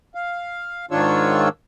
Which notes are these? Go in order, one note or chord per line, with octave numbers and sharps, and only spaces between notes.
F5
G#2 D#3 D4 F4 C#5 E6